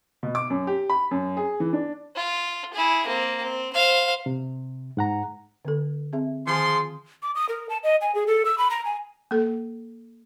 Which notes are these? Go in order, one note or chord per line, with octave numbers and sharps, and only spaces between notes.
B2
D6
F#2
G4
B5
F#2
G#4
E3
D4
F4
E4 G#4
A#3 C4
C4
C5 F5
C3
G#2 F#5 A#5
D3 B3 A4
C4 G#4 E5
D#3 F3 G#4 C6
D6
D#6
A#4
A5
D#5
G#5
G#4
A4
E6
B5
A#5
G#5
A#3 A4